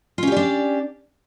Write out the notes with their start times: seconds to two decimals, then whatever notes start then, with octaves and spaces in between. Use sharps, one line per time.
0.18 F4
0.23 C#4
0.27 G4
0.32 D5
0.37 D4